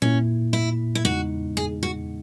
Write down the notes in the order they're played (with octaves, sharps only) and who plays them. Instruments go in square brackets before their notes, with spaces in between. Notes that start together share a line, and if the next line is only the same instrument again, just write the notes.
[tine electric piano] A#2 A#3 E4 [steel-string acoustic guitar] C#4
[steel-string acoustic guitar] E4
E4
[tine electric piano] E2 C#3 G#3 B3 D#4 [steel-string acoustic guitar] F#4
[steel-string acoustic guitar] G#4
F#4